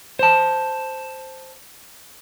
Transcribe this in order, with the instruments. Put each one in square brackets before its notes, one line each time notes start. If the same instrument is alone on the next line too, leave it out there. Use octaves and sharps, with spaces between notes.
[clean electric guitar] C5 A5